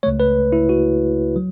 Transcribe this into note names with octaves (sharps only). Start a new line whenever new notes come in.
C#2 C#3 A3 C#5
B4
E4
F#4
F#3